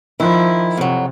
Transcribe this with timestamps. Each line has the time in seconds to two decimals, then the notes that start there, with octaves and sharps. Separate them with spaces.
0.20 D#3 F3 E4
0.77 F2 C3 F#3